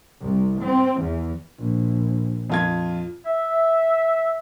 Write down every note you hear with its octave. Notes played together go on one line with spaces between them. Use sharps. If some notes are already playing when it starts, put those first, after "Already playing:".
C2
C4
E2
A#1
F2 F4 G#6
E5